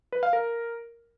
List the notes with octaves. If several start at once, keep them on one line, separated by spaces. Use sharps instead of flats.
B4
F5
A#4